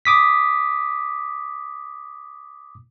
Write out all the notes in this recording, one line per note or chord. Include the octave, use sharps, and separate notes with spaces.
D6 D#6 B6